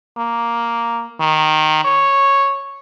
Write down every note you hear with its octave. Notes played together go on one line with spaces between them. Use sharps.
A#3
D#3
C#5